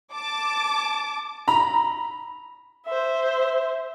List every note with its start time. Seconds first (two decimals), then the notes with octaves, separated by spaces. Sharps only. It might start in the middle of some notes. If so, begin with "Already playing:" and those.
0.13 A5 D6
1.48 A#5 B5
2.86 C5 E5